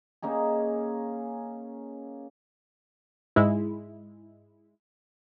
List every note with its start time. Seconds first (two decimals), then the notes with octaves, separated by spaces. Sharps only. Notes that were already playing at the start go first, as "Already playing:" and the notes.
0.22 A#3 C#4 D#4 G#4
3.36 G#2 G#3 E4